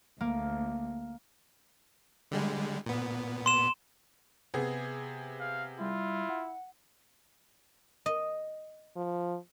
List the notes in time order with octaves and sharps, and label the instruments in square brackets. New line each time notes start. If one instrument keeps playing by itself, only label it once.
[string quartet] D2 [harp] A#3
[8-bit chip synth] D3 G3 G#3
A#2 B3
[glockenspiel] C6 E7
[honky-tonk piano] C3 B3 G#4
[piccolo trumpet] F5
[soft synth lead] G3 [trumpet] E4 [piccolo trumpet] F4
[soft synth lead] F#5
[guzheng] D#5
[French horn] F3